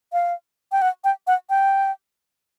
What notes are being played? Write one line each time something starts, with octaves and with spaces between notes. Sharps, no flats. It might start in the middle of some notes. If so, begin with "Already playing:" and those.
F5
G5
F#5
G5
F#5
G5